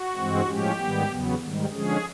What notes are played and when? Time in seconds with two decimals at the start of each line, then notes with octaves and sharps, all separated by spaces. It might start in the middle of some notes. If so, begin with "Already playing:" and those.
Already playing: F#4
0.16 G2 E3 G#3 C4
0.46 A2 F3 G#3 C#4 G4
0.78 G#2 D#3 G3 B3
1.10 E2 C#3 F#3 B3
1.40 G#2 D#3 G3
1.72 D3 F3 G#3 C#4 G#4